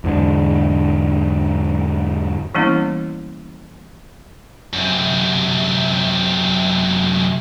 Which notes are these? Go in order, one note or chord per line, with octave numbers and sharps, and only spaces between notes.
E2 G#2 D3
E3 G3 A#3 B3 C#4 E4
F#2 C3